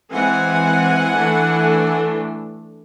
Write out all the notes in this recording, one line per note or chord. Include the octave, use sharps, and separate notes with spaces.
E3 G#3 C4 F#5 G#5
E3 A3 D4